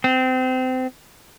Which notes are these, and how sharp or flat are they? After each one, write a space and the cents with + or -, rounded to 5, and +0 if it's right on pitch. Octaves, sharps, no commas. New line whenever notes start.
C4 -25